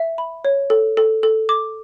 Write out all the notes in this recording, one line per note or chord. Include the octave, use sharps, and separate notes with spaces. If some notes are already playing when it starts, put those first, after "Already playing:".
Already playing: E5
B5
C#5
A4
A4
A4
D6